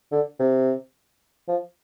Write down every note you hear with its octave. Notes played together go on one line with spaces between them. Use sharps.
D3
C3
F3